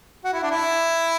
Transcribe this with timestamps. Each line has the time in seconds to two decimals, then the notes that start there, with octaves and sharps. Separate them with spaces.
0.25 F#4
0.34 E4
0.43 D4
0.51 E4